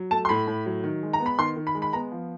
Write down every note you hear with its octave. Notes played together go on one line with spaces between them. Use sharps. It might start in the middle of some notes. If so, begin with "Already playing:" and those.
Already playing: F#3
A3 A5
C6
A2 B5
A2
F#3
D#3
G#3
A#5
B3
B5
D#3 C6
D#3
B5
G#3
B5
B3 A#5
F3